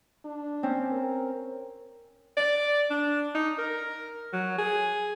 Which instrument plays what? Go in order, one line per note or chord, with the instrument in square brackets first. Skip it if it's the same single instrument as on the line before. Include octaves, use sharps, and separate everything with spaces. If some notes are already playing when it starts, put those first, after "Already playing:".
[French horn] D4
[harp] C4 C#4
[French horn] A#4
[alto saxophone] D5
D4
D#4
A#4
F#3
G#4